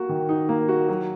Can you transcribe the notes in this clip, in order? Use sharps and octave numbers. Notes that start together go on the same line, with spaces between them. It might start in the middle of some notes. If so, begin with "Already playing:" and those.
Already playing: A#3 F#4
D#3
D#4
A#3
F#4
F#3